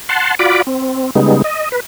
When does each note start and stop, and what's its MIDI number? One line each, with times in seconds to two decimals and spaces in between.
0.09 0.35 78
0.09 0.35 81
0.09 0.35 84
0.39 0.62 65
0.39 0.62 66
0.39 0.62 74
0.39 0.62 83
0.39 0.62 86
0.67 1.11 60
1.15 1.42 49
1.15 1.42 55
1.15 1.42 56
1.15 1.42 59
1.15 1.42 63
1.44 1.69 75
1.72 1.80 71